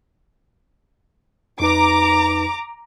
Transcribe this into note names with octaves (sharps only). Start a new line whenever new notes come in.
F2 D#4 B4 A#5 D6